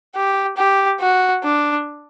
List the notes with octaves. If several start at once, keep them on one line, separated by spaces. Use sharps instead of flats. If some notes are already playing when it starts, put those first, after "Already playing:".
G4
G4
F#4
D4